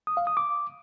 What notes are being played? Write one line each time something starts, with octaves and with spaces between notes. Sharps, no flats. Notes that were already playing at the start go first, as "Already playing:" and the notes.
D#6
F5
D#6
D6